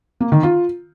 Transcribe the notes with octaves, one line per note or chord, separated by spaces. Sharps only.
A#3
D#3
F4